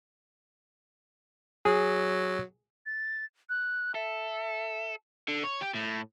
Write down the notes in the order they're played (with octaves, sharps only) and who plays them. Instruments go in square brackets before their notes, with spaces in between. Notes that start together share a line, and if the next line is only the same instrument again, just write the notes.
[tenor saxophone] F#3 [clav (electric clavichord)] G#4
[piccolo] A6
F#6
[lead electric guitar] A4 [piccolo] E5
[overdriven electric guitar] D3
C#5
G4
A2